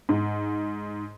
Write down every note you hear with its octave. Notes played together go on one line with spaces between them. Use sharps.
G#2